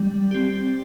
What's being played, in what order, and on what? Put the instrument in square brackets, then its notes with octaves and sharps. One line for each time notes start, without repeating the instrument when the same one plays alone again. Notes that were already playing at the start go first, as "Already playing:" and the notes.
Already playing: [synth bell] G3
C4 G4